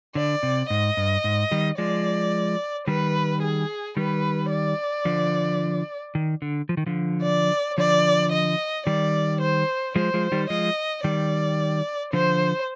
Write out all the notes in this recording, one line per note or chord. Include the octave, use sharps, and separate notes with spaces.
D3 D5
C3
G#2 D#5
G2
G#2
D#3 G3
F3 G#3 D5
D#3 G3 B4
G#4
D#3 G3 B4
D5
D3 F3
D#3
D3
F3
D#3
D3 F3
D5
D3 F3 D5
D#5
D#3 G3 D5
C5
F3 G#3 C5
F3 G#3
D#3 G3
F3 G#3 D#5
D#3 G3 D5
D3 F3 C5